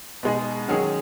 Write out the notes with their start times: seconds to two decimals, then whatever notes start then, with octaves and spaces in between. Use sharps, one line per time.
0.23 B2 G#3 D#4 G#4
0.68 D#3 F#3 C#4 G#4